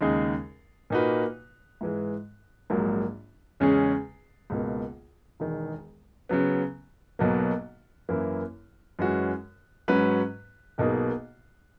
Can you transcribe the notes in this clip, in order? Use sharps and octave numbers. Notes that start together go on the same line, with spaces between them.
D#2 C#3 G#3 D#4 G#4
A#2 A#3 D#4 F#4 B4
G#2 E3 G#3
A#1 G#2 F#3 A#3
E2 C#3 G#3 C#4 G#4
C#2 B2 A#3
E1 E2 D#3
C#3 F#3 B3
B1 B2 F#3 A#3
F#2 E3 A#3 E4
F#2 E3 G#3 C#4 F#4
G#2 F#3 C#4 F#4 B4
B1 B2 A#3 D#4 G#4